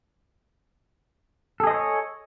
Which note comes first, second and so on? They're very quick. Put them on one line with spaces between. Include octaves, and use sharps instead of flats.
A4 G#4 D#5 C5 C#5